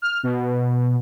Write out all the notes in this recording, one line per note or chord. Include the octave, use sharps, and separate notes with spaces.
F6
B2